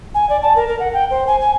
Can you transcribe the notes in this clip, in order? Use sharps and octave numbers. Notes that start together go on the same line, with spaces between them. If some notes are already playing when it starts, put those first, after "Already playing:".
G#5
D5
A5
A#4
A#4
F#5
G5
C5
G#5
G#5